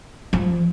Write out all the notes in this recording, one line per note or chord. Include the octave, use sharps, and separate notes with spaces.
F3